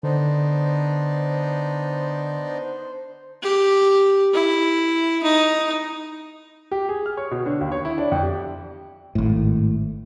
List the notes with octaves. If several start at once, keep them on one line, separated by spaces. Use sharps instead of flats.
D3 B3 D4 D#4 C5
G4
E4
D#4
G4
G#4
F6
C#5
B2
D3
D#2
C#5
E4
D4
F2
G4
G#1 A2